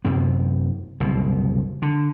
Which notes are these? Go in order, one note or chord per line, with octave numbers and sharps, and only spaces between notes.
F#2 C3 B3
F#1 C2 B2
D3